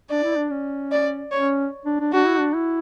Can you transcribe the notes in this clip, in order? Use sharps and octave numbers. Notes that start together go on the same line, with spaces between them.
D4 D5
E4
D4
C#4
D5
C#4 C#5
D4
D4
D4 F#4
E4
D4
E4